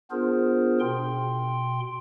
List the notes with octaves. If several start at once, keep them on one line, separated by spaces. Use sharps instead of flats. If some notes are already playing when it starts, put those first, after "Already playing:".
B3 D4 F4 G#4 A#4 C5
B2 G5 C6